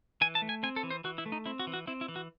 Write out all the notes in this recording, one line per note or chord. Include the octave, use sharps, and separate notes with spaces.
E3 G#5
A5
A3
G#5
C4 G#5
A4
E3
C5
E3 F#4
E4
A3
D#4
C4 E4
F#4
E3
F#4
C4 E4
E4
E3
F#4